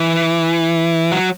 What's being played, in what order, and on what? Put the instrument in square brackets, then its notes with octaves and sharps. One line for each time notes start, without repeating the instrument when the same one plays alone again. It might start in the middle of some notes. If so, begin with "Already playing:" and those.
Already playing: [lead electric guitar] E3
F#3